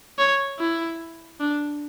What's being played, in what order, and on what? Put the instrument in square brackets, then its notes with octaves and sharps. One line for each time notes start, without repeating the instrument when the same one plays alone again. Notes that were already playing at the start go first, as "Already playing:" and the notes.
[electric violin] C#5
E4
D4